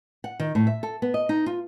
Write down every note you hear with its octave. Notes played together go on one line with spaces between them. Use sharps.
F#5
D#3
A2
E5
A4
B3
D#5
D#4
F4